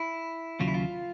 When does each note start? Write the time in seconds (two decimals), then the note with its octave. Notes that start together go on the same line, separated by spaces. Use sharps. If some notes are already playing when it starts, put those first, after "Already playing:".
Already playing: E4
0.60 D#2 C#3 F#3 F4
0.68 E4
0.74 F4